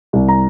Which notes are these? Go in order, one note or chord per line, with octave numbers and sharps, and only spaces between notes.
C2
A#5